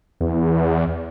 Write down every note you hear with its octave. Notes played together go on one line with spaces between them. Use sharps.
E2